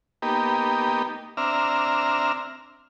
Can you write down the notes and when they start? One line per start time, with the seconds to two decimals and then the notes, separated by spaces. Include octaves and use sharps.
0.22 A#3 B3 D#4 G4
1.37 C4 D4 E5 A#5 F6